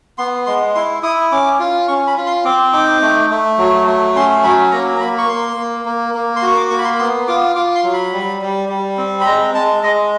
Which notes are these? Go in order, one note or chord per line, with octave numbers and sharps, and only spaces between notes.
B3 C6
G#3 C6
E4 C6
E4 D#6
C#4 D6
F4
C#4 C#6
B5
F4
C6
C4 D6
D#4 D6
A3
A3
F#3
A3
C#4 C6
F#3 B5
A#3 A#5
A#5
A#3 B5
C#6
A#3 C6
A#3
A#3
A#3
C6
F#4 C#6
D6
A#3 C#6
B5
C6
B3 C6
F4 D6
F4 D6
C6
F#3
B5
G3
G3
G3
C4
B5
G#3 A#5
G#3 A5
G#3 D#5